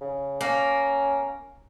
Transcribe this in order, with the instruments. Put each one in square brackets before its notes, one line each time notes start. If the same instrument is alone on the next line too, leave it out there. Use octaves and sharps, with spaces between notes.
[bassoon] C#3
[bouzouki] A#3 [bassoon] C#4